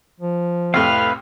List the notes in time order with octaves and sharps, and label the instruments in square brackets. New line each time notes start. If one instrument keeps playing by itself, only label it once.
[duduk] F3
[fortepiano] C2 A2 [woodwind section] F2 C4 F6 [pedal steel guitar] B4 F5